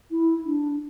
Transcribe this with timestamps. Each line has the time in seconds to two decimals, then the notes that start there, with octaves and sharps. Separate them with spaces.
0.11 E4
0.45 D4